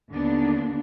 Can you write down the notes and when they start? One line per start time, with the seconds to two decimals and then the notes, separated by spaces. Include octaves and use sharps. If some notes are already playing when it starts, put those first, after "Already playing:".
0.10 D#2 D3 A#3 B3 D4